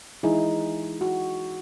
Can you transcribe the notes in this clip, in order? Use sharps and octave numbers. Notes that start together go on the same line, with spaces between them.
E3 G#3 D#4 E4 G#4
F#4